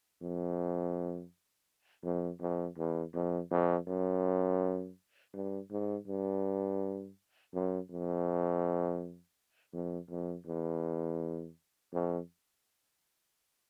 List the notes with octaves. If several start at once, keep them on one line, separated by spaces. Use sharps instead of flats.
F2
F2
F2
E2
F2
F2
F#2
G2
G#2
G2
F#2
F2
F2
F2
E2
F2